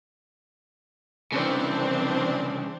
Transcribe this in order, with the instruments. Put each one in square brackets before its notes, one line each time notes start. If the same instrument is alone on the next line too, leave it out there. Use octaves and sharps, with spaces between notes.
[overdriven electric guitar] C2 C#3 [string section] E3 C4 D4